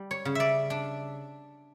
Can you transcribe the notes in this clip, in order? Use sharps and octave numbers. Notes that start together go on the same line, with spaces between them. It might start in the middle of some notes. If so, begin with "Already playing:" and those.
Already playing: G3
C#5
C#3
D5 E5
D4